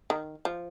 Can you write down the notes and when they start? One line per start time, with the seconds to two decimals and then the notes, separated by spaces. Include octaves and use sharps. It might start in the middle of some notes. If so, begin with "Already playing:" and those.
0.10 D#3
0.45 F3